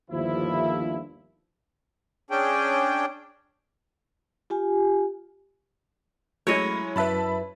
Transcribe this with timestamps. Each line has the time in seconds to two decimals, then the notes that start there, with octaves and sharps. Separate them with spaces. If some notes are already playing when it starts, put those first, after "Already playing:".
0.11 G1 D#2 F3 E4
2.31 C#4 D4 G#4 G5
4.50 F4 G4 G#5
6.47 F#3 G#3 A3 C#4 E4 C#5 D#5
6.96 F#2 B4 E5 A5 B5